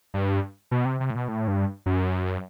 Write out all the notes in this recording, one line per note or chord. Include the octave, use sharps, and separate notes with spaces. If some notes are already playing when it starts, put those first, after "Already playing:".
G2
B2
C3
C3
A2
B2
A2
G2
F#2